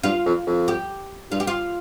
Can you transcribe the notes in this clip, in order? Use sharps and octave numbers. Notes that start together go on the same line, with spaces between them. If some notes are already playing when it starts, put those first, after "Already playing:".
G2 F4
F2
F2
G4
G2 F4
G4
F4